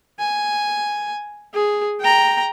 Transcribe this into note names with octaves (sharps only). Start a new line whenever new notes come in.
G#5
G#4
G5 A#5